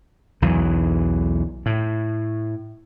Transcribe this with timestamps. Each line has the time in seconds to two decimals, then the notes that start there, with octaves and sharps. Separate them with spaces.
0.42 B1 E2 E3 F#3
1.66 A2